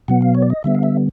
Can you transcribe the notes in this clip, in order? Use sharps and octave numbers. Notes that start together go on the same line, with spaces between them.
B2 F#3 B3 F#5
F5
C#5
D5
D#5
D3 G3 B3 E5
F5
E5